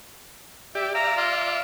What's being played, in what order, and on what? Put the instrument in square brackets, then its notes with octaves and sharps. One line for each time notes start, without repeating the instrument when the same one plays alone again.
[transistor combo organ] G4 D5 [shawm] E5
[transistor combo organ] D5 E5 F5 [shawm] A#5
[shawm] F4